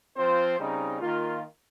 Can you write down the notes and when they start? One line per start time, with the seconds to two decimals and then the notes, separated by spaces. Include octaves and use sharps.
0.16 F3 C4 F4 C5
0.58 C#3 G3 C4 D#4
1.00 D#3 A#3 F4